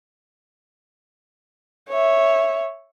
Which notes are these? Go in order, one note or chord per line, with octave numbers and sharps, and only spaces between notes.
C#5 E5